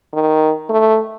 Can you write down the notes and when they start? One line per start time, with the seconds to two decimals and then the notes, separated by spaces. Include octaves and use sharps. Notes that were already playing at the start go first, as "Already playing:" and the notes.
0.13 D#3
0.69 A3